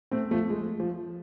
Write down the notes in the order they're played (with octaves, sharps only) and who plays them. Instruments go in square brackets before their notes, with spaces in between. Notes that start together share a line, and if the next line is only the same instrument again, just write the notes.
[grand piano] A3 C4
F3 A3
G#3
F3